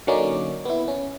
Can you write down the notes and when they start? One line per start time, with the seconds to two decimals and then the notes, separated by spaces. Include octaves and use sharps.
0.07 D3 F#3 A#3 C#4 D#4 D5
0.65 B3 E4
0.88 C#4